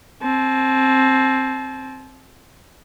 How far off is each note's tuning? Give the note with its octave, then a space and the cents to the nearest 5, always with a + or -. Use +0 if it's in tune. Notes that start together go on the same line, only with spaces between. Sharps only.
C4 +10 A5 -35